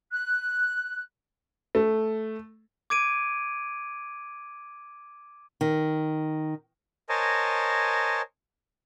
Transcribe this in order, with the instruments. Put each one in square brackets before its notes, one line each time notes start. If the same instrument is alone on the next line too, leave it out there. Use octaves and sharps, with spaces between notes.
[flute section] F#6
[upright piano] A3
[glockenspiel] D6 G#6 D7 D#7
[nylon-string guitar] D#3
[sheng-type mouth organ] A#4 C5 C#5 D#5 G#5 A5